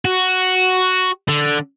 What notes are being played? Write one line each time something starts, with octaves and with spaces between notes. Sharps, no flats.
F#4
D3